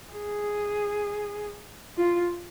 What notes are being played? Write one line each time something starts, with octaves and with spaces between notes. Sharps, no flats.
G#4
F4